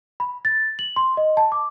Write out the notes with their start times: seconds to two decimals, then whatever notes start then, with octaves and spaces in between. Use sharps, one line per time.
0.20 B5
0.45 A6
0.79 F#7
0.96 C6
1.17 D#5
1.37 A5
1.52 D6